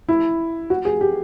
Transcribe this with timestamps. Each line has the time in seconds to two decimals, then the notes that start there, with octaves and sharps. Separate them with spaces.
0.09 E4
0.70 F#4
0.85 G#4
1.01 G4